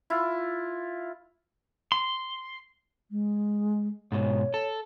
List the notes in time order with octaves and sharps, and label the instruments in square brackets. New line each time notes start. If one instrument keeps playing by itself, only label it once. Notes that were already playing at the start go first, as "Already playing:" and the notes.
[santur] E4 F4
[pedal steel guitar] C6
[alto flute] G#3
[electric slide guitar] G#2 B2 [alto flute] C#5
[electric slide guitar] A4